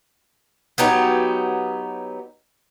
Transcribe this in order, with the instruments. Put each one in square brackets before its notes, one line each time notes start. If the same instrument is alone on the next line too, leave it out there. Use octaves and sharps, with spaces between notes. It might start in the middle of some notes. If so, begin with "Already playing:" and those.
[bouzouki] F#3 B3 D#4 G4